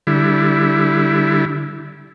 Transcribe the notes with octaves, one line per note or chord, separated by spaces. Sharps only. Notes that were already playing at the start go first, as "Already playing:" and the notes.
D3 G3 E4